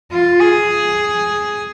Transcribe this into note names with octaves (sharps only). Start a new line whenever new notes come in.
F4
G#4